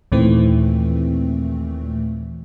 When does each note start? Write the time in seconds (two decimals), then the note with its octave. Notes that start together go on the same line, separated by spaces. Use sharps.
0.12 D#2 A#2 D#3 E3 A3 C4